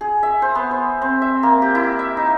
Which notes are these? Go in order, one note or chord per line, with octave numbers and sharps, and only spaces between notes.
G#4
E5
C5
B3
C5
C4
E5
A#3
G4
E4
E5
D#4